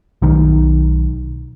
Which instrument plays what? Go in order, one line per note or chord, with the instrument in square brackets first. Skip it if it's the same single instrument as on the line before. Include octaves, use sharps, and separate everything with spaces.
[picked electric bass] B1 D#3